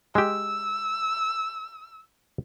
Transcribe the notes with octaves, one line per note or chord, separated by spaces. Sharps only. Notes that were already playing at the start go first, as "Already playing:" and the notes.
G#3 G4 E6